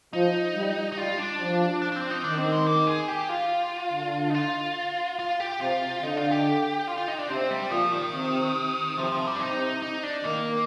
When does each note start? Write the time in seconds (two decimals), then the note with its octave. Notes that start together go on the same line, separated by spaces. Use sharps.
0.13 F3 D#4
0.55 G3
0.92 D#4
0.98 G3 F4
1.18 D4
1.39 F3
1.82 D4
1.92 D4
1.96 C4
2.10 D#4
2.24 D#3 D4
2.38 C4
2.52 G#3
2.66 A#3
2.87 G#4
3.08 G4
3.29 F4
3.92 D3
4.30 D#4
4.34 F4
5.19 F4
5.40 G4
5.61 C3 F4
6.02 D3 D#4
6.17 F4
6.31 G4
6.87 F4
6.98 F4
7.08 D#4
7.18 D4
7.29 C3 C4
7.50 G3
7.71 A#2 F3
7.92 D#3
8.14 C3
8.97 C3 F3
9.12 F3
9.26 G3
9.36 D4
9.40 C3 D#4
9.82 D#4
10.03 D4
10.24 D#3 A#3